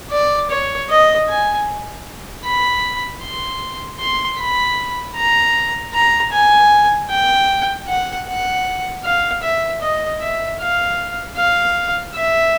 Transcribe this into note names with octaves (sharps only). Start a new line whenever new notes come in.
D5
C#5
D#5
G#5
B5
C6
C6
B5
A#5
A#5
G#5
G5
F#5
F#5
F5
E5
D#5
E5
F5
F5
E5